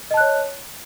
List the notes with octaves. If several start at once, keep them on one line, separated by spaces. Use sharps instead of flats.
C#5 D#5 A5 F#6